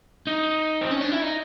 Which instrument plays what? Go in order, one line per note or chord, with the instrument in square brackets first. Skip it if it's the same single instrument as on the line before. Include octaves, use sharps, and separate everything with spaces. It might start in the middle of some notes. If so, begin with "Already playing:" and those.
[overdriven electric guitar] D#4
C4
C#4
D4
E4
D#4